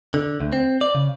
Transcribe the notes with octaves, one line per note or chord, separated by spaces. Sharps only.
D3
D2
C4
D5
C#3